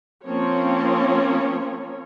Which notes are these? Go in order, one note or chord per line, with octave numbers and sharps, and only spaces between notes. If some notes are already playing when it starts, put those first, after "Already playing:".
F3 A#3 C4 C#4 C#5